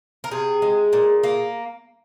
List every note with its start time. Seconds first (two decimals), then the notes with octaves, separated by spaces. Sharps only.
0.24 A#4
0.31 C3 G#4
0.62 G#3
0.93 A#2
1.23 A#3